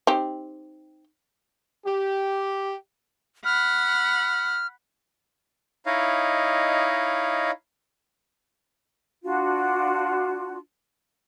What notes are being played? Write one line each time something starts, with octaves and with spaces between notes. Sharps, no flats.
C4 D#4 G4
G4
F#5 B5 F6
D#4 E4 C#5 D#5 F5
D4 F4 F#4